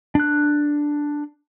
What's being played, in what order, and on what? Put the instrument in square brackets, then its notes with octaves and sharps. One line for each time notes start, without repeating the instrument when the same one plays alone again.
[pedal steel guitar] D4 F#6